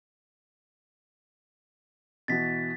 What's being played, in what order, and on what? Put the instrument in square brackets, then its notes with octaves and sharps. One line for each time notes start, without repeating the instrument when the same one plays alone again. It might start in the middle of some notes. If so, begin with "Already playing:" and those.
[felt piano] B2 E3 F#4 [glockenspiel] A6 B6